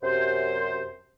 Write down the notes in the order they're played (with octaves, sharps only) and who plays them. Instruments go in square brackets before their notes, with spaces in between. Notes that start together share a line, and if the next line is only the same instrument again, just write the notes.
[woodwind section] F#2 C3 C5